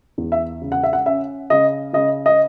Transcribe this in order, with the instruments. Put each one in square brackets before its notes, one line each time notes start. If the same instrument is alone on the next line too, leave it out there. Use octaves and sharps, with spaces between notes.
[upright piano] E2
E5
C#3
F#5
E5
F#5
C#4 E5
C#3 D#5
C#3 D#5
D#5